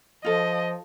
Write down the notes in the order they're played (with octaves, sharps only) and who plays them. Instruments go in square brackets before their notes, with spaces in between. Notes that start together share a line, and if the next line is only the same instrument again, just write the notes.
[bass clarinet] F3 [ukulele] F4 A4 [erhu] D#5